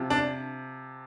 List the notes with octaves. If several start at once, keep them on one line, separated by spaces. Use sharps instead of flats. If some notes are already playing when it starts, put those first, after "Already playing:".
Already playing: C3 F3
D4